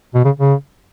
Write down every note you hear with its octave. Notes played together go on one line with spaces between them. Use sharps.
B2
C#3
C#3